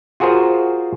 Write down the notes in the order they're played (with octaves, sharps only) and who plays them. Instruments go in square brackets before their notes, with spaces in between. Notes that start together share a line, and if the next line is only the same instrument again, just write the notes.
[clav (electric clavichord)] F4 F#4 G#4 A#4 C5